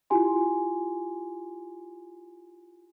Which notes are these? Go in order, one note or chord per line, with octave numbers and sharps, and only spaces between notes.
E4 F4 G4 G#5 C6